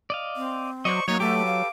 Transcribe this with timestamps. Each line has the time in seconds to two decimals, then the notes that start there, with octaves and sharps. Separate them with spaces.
0.10 D5 D#5 F5
0.36 C4
0.85 F#3 C5 D5 D#5 C#6
1.08 F#3 A#3 D#4 C#5
1.20 A3 G4 A4 B4 D6
1.46 F5